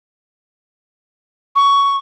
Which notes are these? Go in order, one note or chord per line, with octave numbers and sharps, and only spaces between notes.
C#6